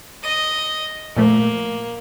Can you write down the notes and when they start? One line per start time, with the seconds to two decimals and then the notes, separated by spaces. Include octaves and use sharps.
0.24 D#5 D#7
1.17 A#2 F3 A3 A#3